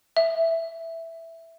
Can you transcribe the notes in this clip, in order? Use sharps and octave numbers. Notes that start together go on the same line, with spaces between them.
E5